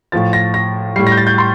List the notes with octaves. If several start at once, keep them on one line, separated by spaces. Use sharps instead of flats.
A2 F3 A6
A#6
A#6
A2 G3 C7
A#6
G6
A6
G6
C6